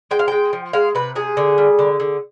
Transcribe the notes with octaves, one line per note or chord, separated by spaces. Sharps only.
G#3 G5
F5
G#3 G5
F3
G#3 F5
C3 B4
C3 G#4
D3
G3
D3
D3